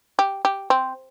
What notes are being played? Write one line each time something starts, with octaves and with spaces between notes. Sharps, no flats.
G4
G4
C4